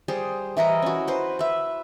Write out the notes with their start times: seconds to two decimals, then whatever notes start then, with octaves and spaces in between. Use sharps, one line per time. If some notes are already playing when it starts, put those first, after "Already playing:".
0.08 G3 G#4 C5
0.57 E3 E4 A#4 D#5
0.82 C#4 F#4
1.07 B4 C5
1.39 B4 E5